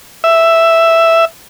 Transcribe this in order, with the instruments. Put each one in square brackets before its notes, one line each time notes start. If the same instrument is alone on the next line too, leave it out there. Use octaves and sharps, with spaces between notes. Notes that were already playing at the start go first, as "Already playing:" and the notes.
[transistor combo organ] E5